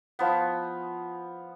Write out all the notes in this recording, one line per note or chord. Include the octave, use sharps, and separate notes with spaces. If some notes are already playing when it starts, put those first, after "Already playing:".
F3 B3